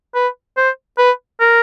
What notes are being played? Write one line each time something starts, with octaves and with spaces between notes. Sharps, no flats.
B4
C5
B4
A#4